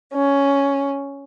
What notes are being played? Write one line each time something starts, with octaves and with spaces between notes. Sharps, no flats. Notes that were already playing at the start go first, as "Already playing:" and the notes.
C#4